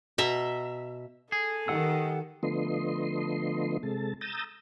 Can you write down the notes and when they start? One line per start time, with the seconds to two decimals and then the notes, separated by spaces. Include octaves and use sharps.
0.18 B2 E5 A#5
1.32 G#4 A4
1.68 D#3 G4 F#5 E6
2.43 D3 F3 A3 B3 D#5 C6
3.83 C3 G#3 A4 A5
4.21 A#5 D#6 E6 G6 A6